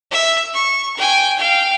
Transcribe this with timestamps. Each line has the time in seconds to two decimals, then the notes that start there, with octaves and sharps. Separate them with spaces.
0.11 E5
0.54 C#6
0.96 G5 G#5
1.39 F5 G5